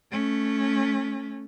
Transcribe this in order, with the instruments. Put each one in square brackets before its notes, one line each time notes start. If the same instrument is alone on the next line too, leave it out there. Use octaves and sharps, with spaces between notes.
[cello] A3 C#4